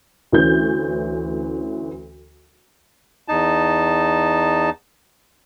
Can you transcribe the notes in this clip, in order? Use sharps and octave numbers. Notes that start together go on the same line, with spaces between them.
D2 E3 C#4 G6
E2 D#4 A5